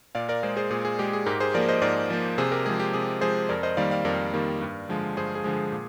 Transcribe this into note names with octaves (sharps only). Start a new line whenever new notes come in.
A#2 D5 F5
A#4 D5
G#3 G#4 C5
G#4 C5
A#2 G#4
G#4
G#3 G4
G#4
G#2 G4 A#4
G#4 C5
F3 A#3 A#4 D5
C5 D#5
G#2 A#4 D5
F3 A#3
C3 G#4 C5
G4 A#4
F3 G#3 G#4
G4
C3 G#4
F3 G#3 G#4 C5
F2 A#4 D5
C5 D#5
D#3 G3 A#3 D5 F5
D5 F5
F2 A#4 D5
D#3 G3 A#3
G2
D3 F3 G#3
G2 G#4 C5
G#4
D3 F3 G#3
G#4
A#2